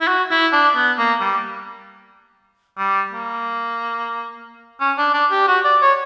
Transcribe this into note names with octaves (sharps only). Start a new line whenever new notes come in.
E4
F#4
E4
D4
B3
A#3
G3
G3
A#3
C#4
D4
D4
G4
F#4
D5
C#5